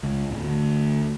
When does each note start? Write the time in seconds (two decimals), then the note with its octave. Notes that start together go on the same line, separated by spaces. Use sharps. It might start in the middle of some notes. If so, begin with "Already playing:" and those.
0.03 C#2
0.31 D1
0.43 D2